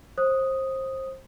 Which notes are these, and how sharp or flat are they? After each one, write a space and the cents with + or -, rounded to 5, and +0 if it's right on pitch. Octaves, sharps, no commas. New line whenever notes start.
C5 +25 D#6 +0